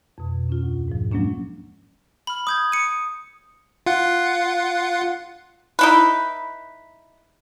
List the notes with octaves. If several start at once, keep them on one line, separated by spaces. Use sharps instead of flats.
F2 B2
C#4 F4
D2
G#2 F3
F3 F#3 G#3 A#3 C#4 D4
B5 F6
B5 D#6 G6 G#6
C#7 D#7
F4 F#5
D#4 E4 B4